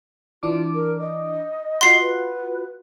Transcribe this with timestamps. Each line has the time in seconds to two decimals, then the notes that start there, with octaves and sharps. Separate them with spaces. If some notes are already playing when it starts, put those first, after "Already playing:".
0.43 E3 D4 F4 D6
0.74 A#4
0.99 D#5
1.81 F4 F#4 F#5 C6 C7
2.00 B4